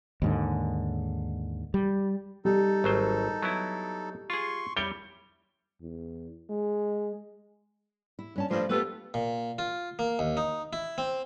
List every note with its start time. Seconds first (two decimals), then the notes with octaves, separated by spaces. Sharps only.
0.22 D#2 G#2 D3
1.74 G3
2.45 G3 D#4 A4
2.84 G#1 F#3 C5
3.42 F#3 B3 E4
4.30 F4 G#4 C6 C#6
4.77 G3 E4 C#5 G5 G7
5.81 E2
6.50 G#3
8.19 E4
8.36 G2 C#4 A5
8.51 G2 F3 A3
8.69 A3 B3 F4 G4 A4 B4
9.14 A#2
9.59 F4
9.99 A#3
10.19 D#2
10.37 D#4
10.73 E4
10.98 C4